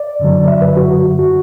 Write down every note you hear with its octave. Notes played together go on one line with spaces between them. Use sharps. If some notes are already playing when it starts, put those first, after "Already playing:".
Already playing: D5
F#2 D3 F#3
E5
B4
F#4
F#4